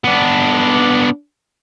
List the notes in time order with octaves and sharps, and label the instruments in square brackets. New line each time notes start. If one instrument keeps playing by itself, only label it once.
[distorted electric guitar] B3 D4